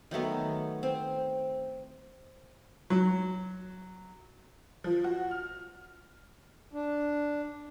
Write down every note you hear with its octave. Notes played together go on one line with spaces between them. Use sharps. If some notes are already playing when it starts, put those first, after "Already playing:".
D#3 F#3 A3 B3
C4
F#3
F3
F#4
F6
D4